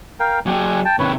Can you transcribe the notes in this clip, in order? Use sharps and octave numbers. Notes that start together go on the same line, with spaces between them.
A#4 F5 G5
F#3 G4 G#4 G#5
G5 A5
C3 D#3 B4 C#5